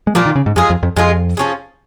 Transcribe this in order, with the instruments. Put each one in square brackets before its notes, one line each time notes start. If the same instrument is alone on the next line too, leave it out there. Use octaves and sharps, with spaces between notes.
[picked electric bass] G#3
[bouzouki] A#2 A#3 F4 [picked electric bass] F3
[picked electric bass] D#3
C#3
G#2
[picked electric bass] F2 [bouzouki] G#3 F4 G#4
[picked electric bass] F2
F2
[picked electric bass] F2 [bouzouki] G#3 F4 G#4
[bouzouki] F3 C#4 G#4